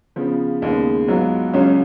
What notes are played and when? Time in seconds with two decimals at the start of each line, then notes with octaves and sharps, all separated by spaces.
0.16 C#3 F3 B3
0.62 D#2 C#3 G#3 B3
1.08 G#2 F#3 B3 F4
1.53 C#2 C#3 F#3 C#4 F4